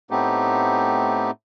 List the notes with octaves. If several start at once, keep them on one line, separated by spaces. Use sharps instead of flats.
A2 A3 B3 C4 D#4 G4